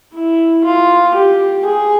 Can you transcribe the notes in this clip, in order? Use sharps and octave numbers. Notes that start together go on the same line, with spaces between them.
E4
F4
G4
G#4